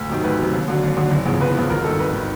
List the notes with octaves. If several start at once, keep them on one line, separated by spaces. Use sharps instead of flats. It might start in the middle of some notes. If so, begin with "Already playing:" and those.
Already playing: D2
C3 D#3 F#3
D2 B4
C3 D#3 F#3
D#2
D3 F#3
D#2
D3 F#3
F#1
E2 C#3 F3
F#1 B4
E2 C#3 F3
G#1 A#4
G2 D#3 A4
G#1 B4
D#3